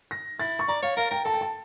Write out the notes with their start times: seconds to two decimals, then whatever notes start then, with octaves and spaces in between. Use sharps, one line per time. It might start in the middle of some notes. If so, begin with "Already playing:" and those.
0.11 A#6
0.40 E4 A6
0.59 C#6
0.68 D5 A#5
0.83 C#5 F5
0.97 A#4 F5
1.11 A#4 G5
1.25 A4 A5
1.34 G5
1.41 A5